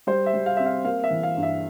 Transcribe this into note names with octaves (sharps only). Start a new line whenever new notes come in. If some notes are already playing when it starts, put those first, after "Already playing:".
G3 C5
E5
G3
F5
C4 E5
F5
A#3 F5
E5
E3
F5
G2
E5